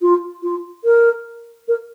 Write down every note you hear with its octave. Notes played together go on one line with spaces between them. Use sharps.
F4
F4
A#4
A#4